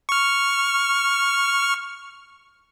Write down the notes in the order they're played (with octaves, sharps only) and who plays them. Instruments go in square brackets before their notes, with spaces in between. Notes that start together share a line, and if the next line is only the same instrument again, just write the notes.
[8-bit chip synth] C#6 F6